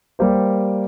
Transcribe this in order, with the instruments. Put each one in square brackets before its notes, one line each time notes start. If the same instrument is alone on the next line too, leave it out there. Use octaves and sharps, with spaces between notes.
[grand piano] G3 A#3 G4 C5